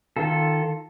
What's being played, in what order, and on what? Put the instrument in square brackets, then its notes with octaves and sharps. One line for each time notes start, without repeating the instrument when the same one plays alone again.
[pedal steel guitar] D#3 F4 A4